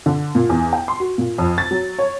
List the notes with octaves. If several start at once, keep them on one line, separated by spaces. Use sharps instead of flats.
D3
A#2
E2
G5
C6
F#4
A#2
F2
A6
F#3
C#5